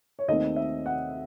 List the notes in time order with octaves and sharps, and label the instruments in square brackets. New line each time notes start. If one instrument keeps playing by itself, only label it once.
[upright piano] C#5
D#2 D#3 A3 C4 D#5
E5
F#5